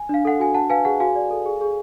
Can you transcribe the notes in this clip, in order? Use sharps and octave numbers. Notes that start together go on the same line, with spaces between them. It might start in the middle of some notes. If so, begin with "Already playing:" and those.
Already playing: G#5
D4 F5
A4 F#5
F#4 G#5
D4 F#5 A5
B4 F5 G#5
G#4 F#5
F#4 F5 G#5
D5
A4
G#4
G#4